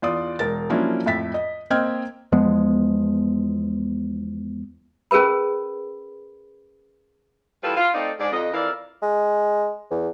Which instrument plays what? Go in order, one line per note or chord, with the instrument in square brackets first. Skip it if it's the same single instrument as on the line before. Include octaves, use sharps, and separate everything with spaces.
[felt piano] E2 F4 D5 D#6
E1 A#4 A6
F3 F#3 A#3 C#4 D4 E4
F2 A2 E5 A6 B6
D#5
A#3 C4 D#5 G5 F6 G#6
[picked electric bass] E2 F3 G#3 B3
[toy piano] C#4 G#4 A#4 B4 B5
[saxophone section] E3 G3 F4 A4 B4
F4
A3 C4 D#4 D5
G#2 D5
F2 D#5
F2 E3 A#4 D5 E5 F5
[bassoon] G#3
E2